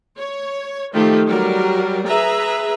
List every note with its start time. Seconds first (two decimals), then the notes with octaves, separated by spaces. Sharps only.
0.18 C#5
0.93 D#3 F3 A3 G4 A4
1.27 F#3 G3 A#4
2.06 G#4 B4 E5 A#5